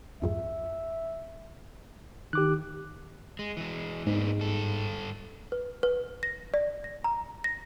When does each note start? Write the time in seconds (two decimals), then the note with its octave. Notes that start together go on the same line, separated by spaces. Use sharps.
0.22 C2 F2 G#2 E5
2.33 D#3 G4 D6 F#6
3.39 G#3
3.57 E3 G#3
4.06 G#2 A#3 B3 D4
4.39 G2 A4
5.52 B4
5.83 B4
6.23 A#6
6.54 D5
6.84 A#6
7.04 A#5
7.44 A#6